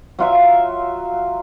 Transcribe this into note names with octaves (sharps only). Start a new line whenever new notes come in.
F#3 F4 E5